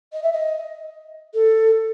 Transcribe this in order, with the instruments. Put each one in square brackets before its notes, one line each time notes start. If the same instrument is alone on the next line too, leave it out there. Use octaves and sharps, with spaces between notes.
[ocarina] D#5
E5
D#5
A4